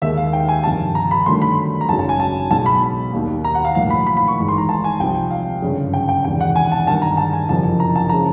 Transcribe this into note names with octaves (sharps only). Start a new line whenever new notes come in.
D#2 D#3 G#3 E5
F5
G5
G#5
G1 F2 C3 D#3 A5
A#5
B5
G1 G2 D#3 F#3 A3 C6
B5
A#5
G#1 F#2 C#3 F#3 A5
A5
G#5
A5
B1 B2 G#3 A5
B5
D#2 D#3 G3 A#3
A#5
F#5
F5
B1 A2 F3 A#3 F5
B5
B5
B5
C#6
G#1 G#2 E3
C6
A#5
A5
G#5
C2 C3 F3 G5
F5
G1 F#2 C#3
G5
G5
E1 E2 C3 D#3 G5
F#5
G#5
A5
G1 G2 D#3 A5
A#5
A5
G#5
F#1 F2 C3 F3 A5
A#5
A5
C#3 F3 G#3 A#5